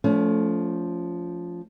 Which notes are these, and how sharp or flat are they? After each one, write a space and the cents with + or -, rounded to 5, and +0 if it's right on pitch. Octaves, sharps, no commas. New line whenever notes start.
F3 +0 A3 -5 C#4 +35